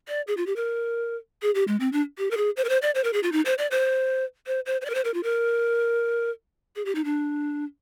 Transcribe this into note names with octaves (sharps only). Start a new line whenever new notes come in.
D5
G#4
F4
G4
A#4
G#4
G4
G#3
C4
D4
G4
A#4
G#4
C5
A#4
C5
D5
C5
A#4
G#4
F4
D#4
C5
D5
C5
C5
C5
C5
D5
A#4
C5
A#4
F4
A#4
G#4
G4
D#4
D4